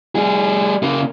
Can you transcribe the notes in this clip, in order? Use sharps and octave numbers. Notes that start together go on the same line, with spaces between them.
G3 G#4
C#3 A#3